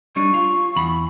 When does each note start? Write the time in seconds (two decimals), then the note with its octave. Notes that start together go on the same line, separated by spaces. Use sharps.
0.16 G3 D4 D#4 C#6
0.34 F4
0.76 E2 B5